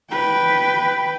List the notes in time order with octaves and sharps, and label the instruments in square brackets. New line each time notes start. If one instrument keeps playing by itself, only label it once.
[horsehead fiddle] B4 G5